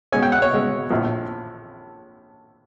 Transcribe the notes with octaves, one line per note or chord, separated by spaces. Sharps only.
B2 G#3 C#4 G#5
G5
F#5
C#5
B2 G#3 C#4
A#1 A2 F3